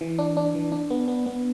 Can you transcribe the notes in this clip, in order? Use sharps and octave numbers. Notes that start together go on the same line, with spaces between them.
E3
D4
D4
E3
D4
B3
B3
B3